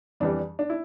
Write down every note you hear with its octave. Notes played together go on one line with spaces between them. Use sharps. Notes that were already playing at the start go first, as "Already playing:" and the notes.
F2 E3 G3 D4
D4
E4